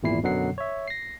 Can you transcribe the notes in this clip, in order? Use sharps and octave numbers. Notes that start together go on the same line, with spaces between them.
G#1 E2 A#2 E4 C7
F#2 B2 D3 F#3 F#5 C7
C#5 E5
A#6 C7